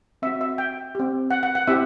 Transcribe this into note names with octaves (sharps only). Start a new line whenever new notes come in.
C4 F#4 E5
E5
G5
C4 G4
F#5
F#5
F#5
C4 E4 G4 E5